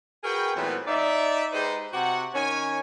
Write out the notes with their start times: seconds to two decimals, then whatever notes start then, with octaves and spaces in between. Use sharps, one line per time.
0.23 F#4 G#4 A#4 B4 G5
0.55 A#2 E3 F#3 A3 B3 C4
0.87 D#4 D5 E5
1.52 G#3 D#4 G4 B4 C5
1.93 C3 F#4 G4 F#5
2.34 D#3 C#4 C#5 G#5